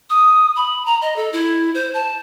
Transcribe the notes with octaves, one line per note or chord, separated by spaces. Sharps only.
D#6
B5
A#5
D#5
A4
E4
C5
A5